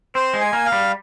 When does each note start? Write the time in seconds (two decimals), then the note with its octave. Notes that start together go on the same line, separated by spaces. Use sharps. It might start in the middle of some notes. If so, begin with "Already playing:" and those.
0.15 C4 C5
0.34 G#3
0.41 G#5
0.53 A#3
0.66 F5
0.72 G3